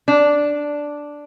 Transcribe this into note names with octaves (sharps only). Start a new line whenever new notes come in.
D4